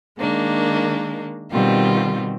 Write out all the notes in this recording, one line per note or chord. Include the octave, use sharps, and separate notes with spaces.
D#3 G#3 A#3 D4
B2 D#3 G3 C4 F4 G4